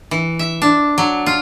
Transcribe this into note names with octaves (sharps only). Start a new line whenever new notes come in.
E3
E5
D4
F#3
F4